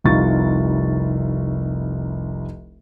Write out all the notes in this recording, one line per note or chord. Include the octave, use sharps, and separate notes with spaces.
F1 C2 D#4 F4 C#6 A6